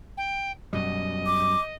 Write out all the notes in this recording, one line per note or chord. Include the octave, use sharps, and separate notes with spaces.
G5
F#2 B2 G3 D#5
D6